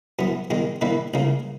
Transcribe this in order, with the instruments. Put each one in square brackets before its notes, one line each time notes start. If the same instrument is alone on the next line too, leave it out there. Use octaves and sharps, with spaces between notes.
[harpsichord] F#2 E3 B3
E2 D#3 G#3
E2 D#3 A#3 E4 B4
C#2 C#3 E3 A#3